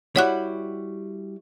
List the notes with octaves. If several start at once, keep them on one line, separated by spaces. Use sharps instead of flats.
G3 E4 F#4 C#5 F#5 F#6